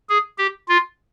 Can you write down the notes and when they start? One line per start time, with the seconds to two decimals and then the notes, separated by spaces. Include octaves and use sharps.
0.09 G#4
0.38 G4
0.69 F4